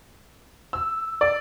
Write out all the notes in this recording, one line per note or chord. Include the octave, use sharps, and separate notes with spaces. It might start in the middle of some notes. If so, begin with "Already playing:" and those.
E6
D5